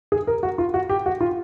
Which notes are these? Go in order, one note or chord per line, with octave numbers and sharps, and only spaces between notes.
G#4
A#4
F#4
F4
F#4
G4
F#4
F4